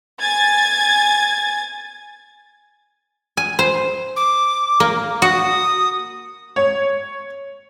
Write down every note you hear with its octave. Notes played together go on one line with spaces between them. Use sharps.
G#5 G#6 A6
G#5
C5
D6
A#3
F#4 D#6
C#5